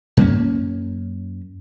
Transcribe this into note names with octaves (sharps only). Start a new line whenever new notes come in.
F#2 A#3 C#4